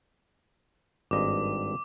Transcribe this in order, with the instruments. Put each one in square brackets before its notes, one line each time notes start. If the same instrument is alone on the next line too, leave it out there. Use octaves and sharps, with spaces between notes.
[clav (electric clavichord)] G#1 G2 D#5 [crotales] D6